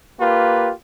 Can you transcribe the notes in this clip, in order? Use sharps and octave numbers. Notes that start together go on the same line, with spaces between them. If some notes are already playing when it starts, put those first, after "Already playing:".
A#3 F4 G4 B4